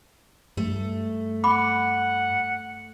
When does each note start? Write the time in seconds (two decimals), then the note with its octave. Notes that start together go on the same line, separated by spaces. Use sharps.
0.57 G2 A3
1.44 F#5 B5 D6